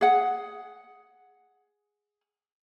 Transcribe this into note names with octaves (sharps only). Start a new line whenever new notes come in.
G#4 F#5